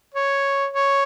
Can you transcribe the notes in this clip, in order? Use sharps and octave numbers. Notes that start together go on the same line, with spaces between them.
C#5
C#5